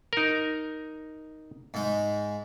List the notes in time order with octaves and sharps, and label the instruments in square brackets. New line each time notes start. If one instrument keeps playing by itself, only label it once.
[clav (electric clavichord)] D#4 A#4
[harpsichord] G#2 G#3